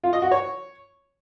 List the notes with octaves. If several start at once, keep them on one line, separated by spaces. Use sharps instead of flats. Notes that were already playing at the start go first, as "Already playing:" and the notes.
F4
D#5
F#4
C#5